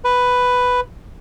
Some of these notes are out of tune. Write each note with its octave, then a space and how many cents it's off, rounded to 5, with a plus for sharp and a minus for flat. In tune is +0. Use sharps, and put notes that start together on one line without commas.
B4 +5